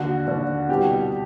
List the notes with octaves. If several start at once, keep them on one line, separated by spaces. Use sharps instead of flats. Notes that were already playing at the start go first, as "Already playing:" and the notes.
Already playing: D#2 D3 F#4
D#2 D3
C2 B2 G4